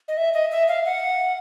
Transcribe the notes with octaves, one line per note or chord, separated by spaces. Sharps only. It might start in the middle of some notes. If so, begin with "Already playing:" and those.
D#5
E5
D#5
E5
F5
F#5